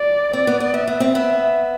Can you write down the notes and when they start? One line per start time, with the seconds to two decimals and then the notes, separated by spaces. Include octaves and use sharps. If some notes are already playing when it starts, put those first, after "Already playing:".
Already playing: D5
0.33 C4 D5
0.47 B3
0.60 B3
0.73 B3 E5
0.87 B3
1.00 C4
1.14 B3 E5